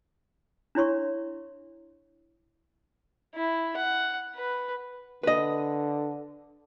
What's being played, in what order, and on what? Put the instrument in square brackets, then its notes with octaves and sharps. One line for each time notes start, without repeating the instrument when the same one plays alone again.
[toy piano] D4 E4 C#5 C6 C#6
[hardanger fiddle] E4
F#5
B4
[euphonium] D3 [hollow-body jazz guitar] B4 D#5